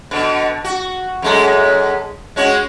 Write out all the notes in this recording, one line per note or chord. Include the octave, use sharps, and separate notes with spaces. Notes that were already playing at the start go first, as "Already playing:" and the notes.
B2 D3
F#4
F#2 G#3 A4
G#3 C#4 F#4